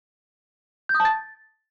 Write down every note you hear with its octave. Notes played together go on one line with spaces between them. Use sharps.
G6
D#6
A5
A6